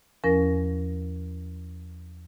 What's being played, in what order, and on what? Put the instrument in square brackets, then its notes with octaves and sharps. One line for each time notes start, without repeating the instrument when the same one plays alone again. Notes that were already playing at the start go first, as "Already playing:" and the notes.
[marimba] E2 F3 C#4 A#4 A#6